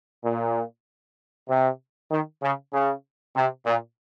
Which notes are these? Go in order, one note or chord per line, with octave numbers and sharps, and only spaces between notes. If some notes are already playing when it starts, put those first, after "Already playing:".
A#2
C3
D#3
C#3
C#3
C3
A#2